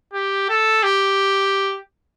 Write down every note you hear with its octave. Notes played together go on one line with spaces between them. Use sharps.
G4
A4
G4